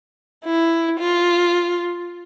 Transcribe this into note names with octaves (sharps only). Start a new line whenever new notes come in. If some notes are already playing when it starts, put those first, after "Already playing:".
E4
F4